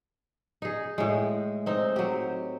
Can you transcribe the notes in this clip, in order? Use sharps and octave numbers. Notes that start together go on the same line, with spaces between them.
D#4 G#4
A2 G#3
C4 D#4
F#3 G4